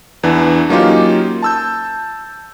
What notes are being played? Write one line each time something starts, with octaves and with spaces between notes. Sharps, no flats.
E2 E3 D4
F#3 A#3 C#4 D#4 F4 G4
A5 E6 G6